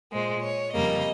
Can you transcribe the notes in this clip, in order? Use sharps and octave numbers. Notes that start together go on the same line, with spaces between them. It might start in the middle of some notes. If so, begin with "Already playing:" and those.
A#2 G#3 C5
C#5
F2 C#3 G3 A#3 D#5